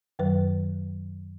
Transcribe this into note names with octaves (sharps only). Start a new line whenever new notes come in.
F#2 D#3 F#3 B4